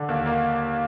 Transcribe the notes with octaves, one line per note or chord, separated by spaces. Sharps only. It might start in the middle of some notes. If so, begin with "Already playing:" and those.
Already playing: D3
D#2
A#3